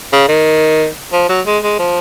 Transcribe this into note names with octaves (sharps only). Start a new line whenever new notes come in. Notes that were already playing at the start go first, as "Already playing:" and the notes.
C#3
D#3
F3
F#3
G#3
G#3
F3